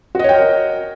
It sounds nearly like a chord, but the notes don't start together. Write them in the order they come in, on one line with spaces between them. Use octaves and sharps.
F#4 D#5 C#5 G5 A#4